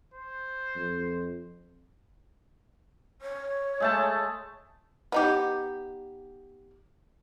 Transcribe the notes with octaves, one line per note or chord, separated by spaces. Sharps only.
C5
F2
C#5
G#3 A3 A5
B3 D#4 G4